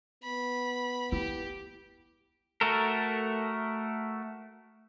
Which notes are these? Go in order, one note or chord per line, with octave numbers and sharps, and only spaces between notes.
B3 B5
E4 G4
A3 F#4 A4 A#4